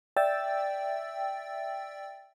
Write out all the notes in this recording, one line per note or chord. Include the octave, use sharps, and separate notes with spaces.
D5 E5 G5 E6 A6